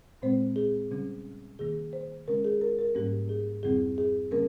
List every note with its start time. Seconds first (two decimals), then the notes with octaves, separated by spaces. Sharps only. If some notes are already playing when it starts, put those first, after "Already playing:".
0.22 A#2 G#3 C4 C5
0.56 G#4
0.91 C#3 G3 C#4
1.59 C3 D#3 A#3 G#4
1.93 C5
2.28 C#3 G#3 C#4 A#4
2.45 G#4
2.61 A#4
2.79 A#4
2.95 G#2 G3 A#3 C#4 G4
3.29 G#4
3.63 F2 C#3 G3 C4 G#4
3.98 G#4
4.31 C#3 G3 A#3 C#4 A#4